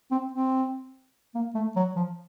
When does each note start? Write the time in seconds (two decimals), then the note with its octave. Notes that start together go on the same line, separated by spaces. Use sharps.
0.11 C4
0.32 C4
1.35 A#3
1.55 A3
1.76 F#3
1.96 F3